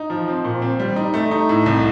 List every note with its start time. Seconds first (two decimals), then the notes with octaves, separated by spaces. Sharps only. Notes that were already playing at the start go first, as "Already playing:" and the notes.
Already playing: D#4
0.10 F3
0.28 C4
0.44 A#2
0.62 C4
0.79 G3
0.96 D#4
1.14 A3
1.31 D#4
1.49 A2
1.66 C2